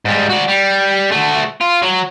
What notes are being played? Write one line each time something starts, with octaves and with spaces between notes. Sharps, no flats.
G#2 G3
F#4 D5
G3
A3 F#4
F4
F#3